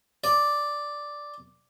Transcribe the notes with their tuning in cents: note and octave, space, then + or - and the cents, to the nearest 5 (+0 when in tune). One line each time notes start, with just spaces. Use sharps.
D5 +0